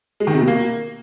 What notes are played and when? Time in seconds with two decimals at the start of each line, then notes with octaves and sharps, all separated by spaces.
0.20 G#3
0.27 D#3
0.34 C3
0.41 B2
0.47 A#3